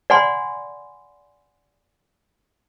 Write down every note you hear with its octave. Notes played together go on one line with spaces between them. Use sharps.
D5 F#5 G#5 B5 C6